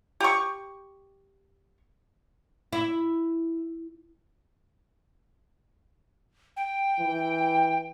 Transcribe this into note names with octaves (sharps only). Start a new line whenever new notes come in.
G4 C#6
E4
G5
E3